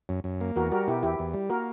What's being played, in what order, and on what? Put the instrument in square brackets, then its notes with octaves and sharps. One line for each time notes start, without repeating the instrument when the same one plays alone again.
[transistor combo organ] F#2
F#2
A#3
[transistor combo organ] E2 [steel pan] F#4 A#4
[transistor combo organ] G3 [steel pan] F#4 A#4
[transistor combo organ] B2 [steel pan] E4 G4
[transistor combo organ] E2 [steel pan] E4 G4
[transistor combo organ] E2
G3
[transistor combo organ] A#3 [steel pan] F#4 A#4